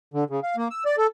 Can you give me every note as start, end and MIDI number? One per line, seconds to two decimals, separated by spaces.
0.14 0.24 50
0.30 0.40 49
0.43 0.56 77
0.57 0.68 58
0.70 0.84 88
0.85 0.96 74
0.98 1.07 69